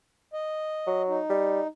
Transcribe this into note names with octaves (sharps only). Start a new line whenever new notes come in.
D#5
F#3
D#4
G3